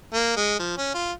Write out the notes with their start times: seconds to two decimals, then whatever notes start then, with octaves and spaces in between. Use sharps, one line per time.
0.14 A#3
0.36 G#3
0.59 F3
0.77 C#4
0.94 F4